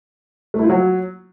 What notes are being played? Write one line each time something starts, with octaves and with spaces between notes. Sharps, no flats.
A3
E4
F4
F#3